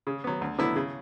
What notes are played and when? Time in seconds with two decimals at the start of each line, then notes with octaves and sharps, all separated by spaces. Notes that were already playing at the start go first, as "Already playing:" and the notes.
0.07 C#3
0.24 F#3 B3
0.41 D2
0.59 D3 F#3 B3 E4
0.76 C#3